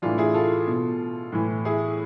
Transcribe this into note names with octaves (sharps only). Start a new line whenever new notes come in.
A2 E3 D4 F4
E4 G#4
F4 A4
B2
A2 E3
E4 G#4